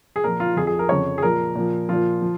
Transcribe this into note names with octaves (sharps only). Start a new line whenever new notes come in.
G#4
A#2 F3 A#4
F4
F2 F3 G#4
G#4
A#4
F2 C#3 F3 C#5
G#4
A#2 F3 A#4
A#2 F3
A#2 F3 F4
F3